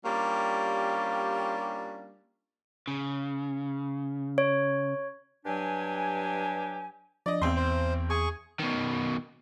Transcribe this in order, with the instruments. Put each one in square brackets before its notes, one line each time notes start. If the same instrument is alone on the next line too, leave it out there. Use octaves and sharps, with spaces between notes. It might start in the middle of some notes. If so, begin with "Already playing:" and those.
[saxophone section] G3 A#3 C#4 D4 F4 G4
[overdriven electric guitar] C#3
[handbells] C#5
[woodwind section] G2 F#3 D4 G4 G#5
[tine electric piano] F3 D4 [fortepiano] D5 D#5
[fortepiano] G#1 C4 C6 [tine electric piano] E2
[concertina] C5
[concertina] G#4 C#6 [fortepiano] G#5
[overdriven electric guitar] B2 D#3